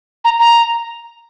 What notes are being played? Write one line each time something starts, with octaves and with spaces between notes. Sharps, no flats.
A#5
A#5